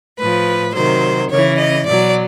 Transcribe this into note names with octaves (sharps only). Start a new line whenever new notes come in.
A2 F3 B4
C3 D#3 F#3 C5
C#3 E3 C#5
D#5
B2 F#3 D5